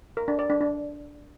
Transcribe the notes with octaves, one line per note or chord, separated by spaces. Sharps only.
A#4
D4
D5
D4
D4